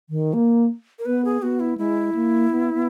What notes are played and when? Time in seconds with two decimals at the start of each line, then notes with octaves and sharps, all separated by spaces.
0.10 D#3
0.34 A#3
0.99 A#4
1.06 B3 B4
1.25 G#4
1.42 B3 F#4
1.60 E4
1.78 G#3 E4
2.15 A#3
2.51 B3
2.74 B3